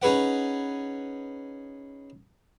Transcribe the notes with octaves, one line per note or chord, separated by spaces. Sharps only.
C#4 D#4 G#4 B4 F#5